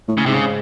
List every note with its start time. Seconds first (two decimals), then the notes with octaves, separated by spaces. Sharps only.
0.08 A2
0.18 C#3
0.26 G#2 C3
0.33 C#3